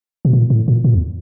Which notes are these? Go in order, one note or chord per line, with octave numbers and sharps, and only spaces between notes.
B2
A#2
A2
A#2
A#2
E2